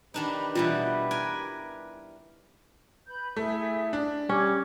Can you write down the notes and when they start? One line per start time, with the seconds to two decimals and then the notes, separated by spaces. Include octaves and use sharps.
0.14 D#3 D4 D#4 G4 B4
0.55 B2 E3 G3 F4
1.11 A#4 G5 G#5
3.08 B4 B5 G6
3.36 A3 E4 G#4 E5
3.93 D4
4.29 G3 C#4 D6 G#6